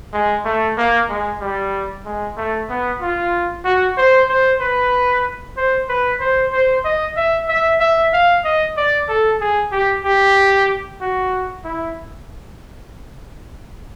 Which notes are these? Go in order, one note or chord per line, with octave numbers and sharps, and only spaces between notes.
G#3
A3
A#3
G#3
G3
G#3
A3
B3
F4
F#4
C5
C5
B4
C5
B4
C5
C5
D#5
E5
E5
E5
F5
D#5
D5
A4
G#4
G4
G4
F#4
E4